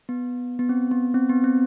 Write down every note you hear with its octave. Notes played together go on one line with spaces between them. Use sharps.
B3
B3
C4
B3
C4
B3
C4